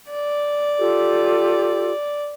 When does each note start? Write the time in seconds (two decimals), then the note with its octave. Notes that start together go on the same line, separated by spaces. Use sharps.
0.10 D5
0.78 F4 G4 A4